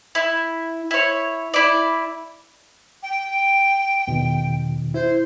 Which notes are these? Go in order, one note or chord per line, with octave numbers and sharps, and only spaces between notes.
E4
E4 C#5
E4 D5
G5
E2 B2 D#3
E4 C5